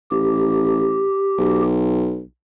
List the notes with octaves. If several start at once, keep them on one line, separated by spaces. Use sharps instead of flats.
A1 G4
B1